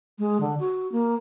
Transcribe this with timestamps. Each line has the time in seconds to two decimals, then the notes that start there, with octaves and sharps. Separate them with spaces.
0.19 G#3
0.41 D3
0.60 F#4
0.92 A#3